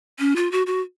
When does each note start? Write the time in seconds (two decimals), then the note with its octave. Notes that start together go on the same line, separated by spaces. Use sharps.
0.19 C#4
0.36 F4
0.52 F#4
0.67 F#4